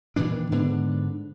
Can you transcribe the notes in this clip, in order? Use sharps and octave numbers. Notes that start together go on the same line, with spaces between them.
A#2 D#3 E3 D4
G#2 D3 B3 D4